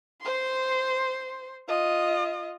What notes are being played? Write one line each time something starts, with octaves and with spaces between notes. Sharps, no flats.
C5 C6
F4 D#5